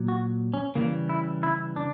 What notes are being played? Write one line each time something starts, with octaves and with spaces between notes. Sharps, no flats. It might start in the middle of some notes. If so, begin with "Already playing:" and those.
Already playing: A#2 F#3
F#4
C#4
C#3 E3 G3 A#3
E4
E4
D4